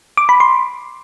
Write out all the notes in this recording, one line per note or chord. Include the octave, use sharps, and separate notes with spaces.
D6
B5
C6